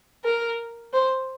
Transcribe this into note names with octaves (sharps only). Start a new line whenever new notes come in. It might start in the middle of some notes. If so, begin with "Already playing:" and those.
A#4
C5